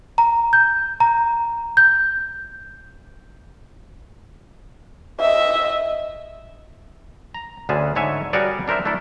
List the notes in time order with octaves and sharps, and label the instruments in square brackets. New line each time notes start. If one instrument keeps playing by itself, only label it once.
[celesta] A#5
G6
A#5
G6
[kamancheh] D#5 E5
[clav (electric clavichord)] A#5
D2 D3 C#4 G#4 A5
G#2 D3 C#5 E5 G#5
G3 F#4 G#4 A#4 C#5 D5
D4 A#4 C5 E5
A3 D4 E4 A4